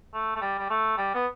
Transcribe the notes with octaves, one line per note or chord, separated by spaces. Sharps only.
A3
A3
G3
G3
A3
G3
B3